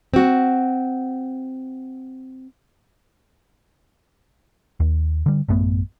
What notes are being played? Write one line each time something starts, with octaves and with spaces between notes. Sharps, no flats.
C4 F#4
D#2
D3 G3
A1 F#2 A3 B3